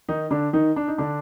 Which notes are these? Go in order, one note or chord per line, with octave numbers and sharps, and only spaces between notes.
D#3 D#4
D3 D4
D#3 D#4
D4
D#4
D3 D4